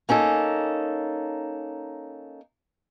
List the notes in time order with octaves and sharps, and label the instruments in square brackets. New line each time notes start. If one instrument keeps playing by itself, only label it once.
[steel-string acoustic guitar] A#3 C#4 D#4 A4